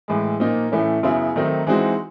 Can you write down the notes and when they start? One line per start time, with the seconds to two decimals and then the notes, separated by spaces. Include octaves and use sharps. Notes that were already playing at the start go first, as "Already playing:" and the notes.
0.08 A2 E3 G#3
0.40 A#2 F3 A#3 D#4
0.72 A2 E3 A3 C#4
1.03 F#2 C#3 F#3 B3 E4
1.36 D#3 F#3 A3 C4 D#4
1.67 E3 G#3 C4 D#4 F#4